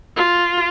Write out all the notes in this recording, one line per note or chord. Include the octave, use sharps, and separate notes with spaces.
F4